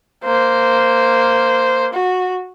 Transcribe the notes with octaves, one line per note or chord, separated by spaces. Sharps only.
A#3 C5
F#4